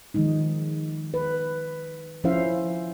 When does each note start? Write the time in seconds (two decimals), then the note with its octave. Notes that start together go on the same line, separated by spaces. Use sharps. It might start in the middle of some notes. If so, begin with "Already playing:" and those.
0.14 D#3 F3 G#3 D#4
1.14 B4
2.24 F3 C#4 E4 C5 E5 F5